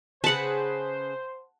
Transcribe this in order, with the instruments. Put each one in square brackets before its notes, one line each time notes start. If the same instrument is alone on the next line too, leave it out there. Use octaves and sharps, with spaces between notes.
[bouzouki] C#3 G#4 B4 [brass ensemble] C5 [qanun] F#5 A5